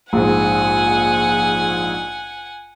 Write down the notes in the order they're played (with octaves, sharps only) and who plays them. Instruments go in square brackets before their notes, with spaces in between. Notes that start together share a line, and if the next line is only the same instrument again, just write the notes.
[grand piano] A#1 G#2 [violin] F#5 G#5